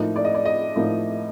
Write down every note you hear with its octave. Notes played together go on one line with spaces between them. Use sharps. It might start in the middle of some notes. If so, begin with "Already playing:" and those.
Already playing: A2 F3 A#3 D#4
D5
D#5
D5
D#5
A2 F3 A#3 D#4